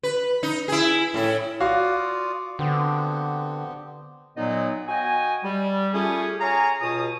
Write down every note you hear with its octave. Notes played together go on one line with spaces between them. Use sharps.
B4
D#4
E4 G#4
A2 E4
F4 F#4 D5 F5 D#6
D3 B3 C4 G4
F#2 A#2 F#3 B3 D#4 D#5
F#4 D#5 G5 G#5
G3
A3 C#4 F4 G4 G#4
G#4 C#5 F5 G#5 A#5
C#2 B2 F4 D#6